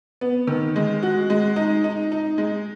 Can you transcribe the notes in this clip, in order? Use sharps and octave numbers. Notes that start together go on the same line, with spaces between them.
B3
D#3
G#3
F#4
G#3
D#4
D#4
D#4
G#3